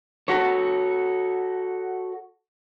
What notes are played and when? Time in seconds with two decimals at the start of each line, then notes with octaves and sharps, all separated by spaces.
0.28 F#4 A4 C#5